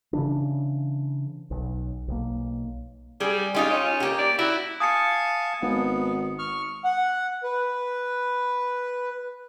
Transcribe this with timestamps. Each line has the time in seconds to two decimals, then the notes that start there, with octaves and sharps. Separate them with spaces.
0.13 C#3 E3 D4
1.51 B1
2.08 B1 A#3
3.20 G3 G#4
3.54 G#3 D#4 F4 G4
3.70 C#4
4.00 A#3 G4
4.19 D5
4.39 E4 F#4
4.80 F5 G#5 A5 D#6 C#7
5.62 G#1 B3
6.39 C#6 F6
6.85 F#5
7.43 B4